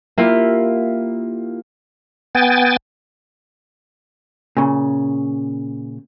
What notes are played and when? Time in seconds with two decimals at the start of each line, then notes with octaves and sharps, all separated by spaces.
0.18 A#3 E4 F4 G4
2.35 B3 G5 G#5 A6
4.57 A#2 C#3